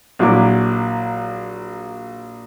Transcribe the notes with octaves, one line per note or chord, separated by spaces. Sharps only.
A#1 F#3 E4 D6